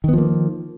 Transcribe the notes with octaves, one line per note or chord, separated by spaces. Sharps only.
D#3 F3 A#3 B3